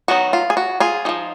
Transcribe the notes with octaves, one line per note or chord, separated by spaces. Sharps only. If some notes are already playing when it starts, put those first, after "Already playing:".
D#3 F#3 B3 D#4 F#4
F4
G#4
F#4
F4 G#4
F3 A#3 D#4